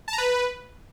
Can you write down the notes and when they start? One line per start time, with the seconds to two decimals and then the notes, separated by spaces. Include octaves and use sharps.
0.08 A5
0.13 A#5
0.18 B4